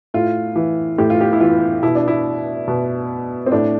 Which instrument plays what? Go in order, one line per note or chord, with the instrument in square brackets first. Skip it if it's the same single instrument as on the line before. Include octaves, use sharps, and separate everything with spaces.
[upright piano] A2 F4
E3
A2 G4
F4
G4
E4
E3 F4
B2 E4
D4
E4
B2
C4
A2 D4